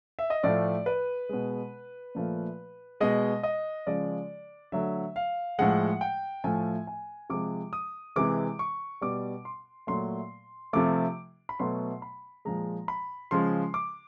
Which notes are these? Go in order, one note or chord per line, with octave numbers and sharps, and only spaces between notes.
E5
D#5
A2 F3 A3 D5
B4
B2 G#3
A#2 F3 A3
B2 G#3 D#5
D#5
C#3 F3 G#3 D5
D3 F#3 A3 E5
F5
A2 F3 G#3 F#5
G5
A2 F3 A3 G#5
G#5
C3 F3 G#3 D6
D#6
C3 E3 G#3 D6
C#6
B2 G3 D6
C6
A#2 F#3 A3 C6
C3 F3 A3 D6
B5
B2 F#3 A3 C6
B5
A#2 F3 G#3 A#5
B5
C#3 F3 G#3 C6
D6